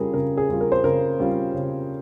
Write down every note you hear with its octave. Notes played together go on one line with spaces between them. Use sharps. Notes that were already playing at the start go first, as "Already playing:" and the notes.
Already playing: C#3 G3 C#4 F4 G#4 A#4
C#3 A#4
G#4
G3 C#4 F4
A#4
C5
C#3 A#4
G3 C#4 F4
C#3